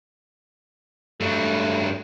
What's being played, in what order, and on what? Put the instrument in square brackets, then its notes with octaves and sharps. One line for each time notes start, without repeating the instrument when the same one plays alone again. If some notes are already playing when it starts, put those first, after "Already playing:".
[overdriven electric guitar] G2 F#3 [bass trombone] A3